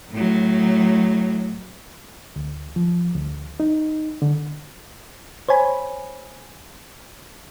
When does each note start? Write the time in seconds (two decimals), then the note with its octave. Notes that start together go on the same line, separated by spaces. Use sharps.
0.11 A2 F#3
2.36 D2
2.76 F3
3.15 D2
3.60 D#4
4.22 D3
5.49 C5 C#5 G#5 B5